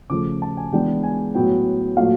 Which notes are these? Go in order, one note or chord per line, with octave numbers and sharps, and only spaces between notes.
C#3 F3 A3 D6
A5
G#5
E3 G#3 B3 D4 G5
G#5
A2 F#3 B3 G5
A#2 F#3 A3 F5